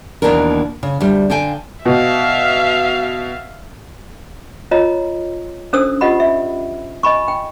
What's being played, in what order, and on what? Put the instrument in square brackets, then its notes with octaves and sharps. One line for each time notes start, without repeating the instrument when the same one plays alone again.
[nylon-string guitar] D#2 B2 E3 A#3 D4 A#4
C#3
D2 G3
D3 F5 G5 G#5
[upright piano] B2 [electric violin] E5 F5
[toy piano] F4 C#5 D#5 A#5
C#4 D4 A4 C5 D#6 E6
F4 G4 D#5 F#5 B5
E5
D#5 G#5 B5 C#6
G5